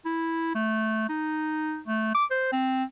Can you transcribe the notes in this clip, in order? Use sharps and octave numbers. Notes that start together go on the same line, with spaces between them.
E4
A3
D#4
A3
D6
C5
C4